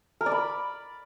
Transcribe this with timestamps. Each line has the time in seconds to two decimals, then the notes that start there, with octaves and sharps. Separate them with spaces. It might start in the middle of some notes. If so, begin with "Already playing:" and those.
0.21 A#4
0.26 D5
0.31 B5